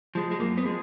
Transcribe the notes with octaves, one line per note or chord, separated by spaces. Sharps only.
F3 G#3
G#3
F#2 A#3
B3
F3 G#3